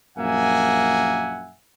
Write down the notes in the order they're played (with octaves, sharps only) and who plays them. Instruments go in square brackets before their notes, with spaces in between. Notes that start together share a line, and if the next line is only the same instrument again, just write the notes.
[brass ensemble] A#1 F#2 A#3 E5 F#5 G#5